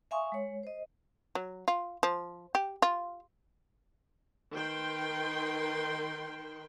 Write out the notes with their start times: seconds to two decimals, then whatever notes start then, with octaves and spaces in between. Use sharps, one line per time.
0.11 E5 F5 G#5 C6 C#6 D#6
0.32 G#3 C#5
0.63 C5 D#5
1.35 F#3
1.68 F4
2.03 F3
2.55 G4
2.82 F4
4.54 D#3 B4 G5 C6